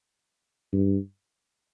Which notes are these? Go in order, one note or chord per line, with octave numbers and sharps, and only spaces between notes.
G2